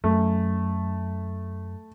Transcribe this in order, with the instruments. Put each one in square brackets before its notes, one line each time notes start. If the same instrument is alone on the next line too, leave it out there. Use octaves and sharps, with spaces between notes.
[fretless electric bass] F#2 [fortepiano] A3